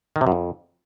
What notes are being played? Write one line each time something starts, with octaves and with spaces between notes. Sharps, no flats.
D#3
C3
F#2
F2